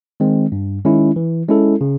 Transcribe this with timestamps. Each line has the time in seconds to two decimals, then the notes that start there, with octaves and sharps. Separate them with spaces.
0.20 D#3 G#3 C4
0.52 G2
0.85 D#3 G#3 C#4 E4
1.16 E3
1.49 G#3 C#4 E4 A4
1.81 C#3